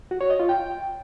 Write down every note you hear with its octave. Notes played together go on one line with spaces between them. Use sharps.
F#4
C#5
D#5
F4
G5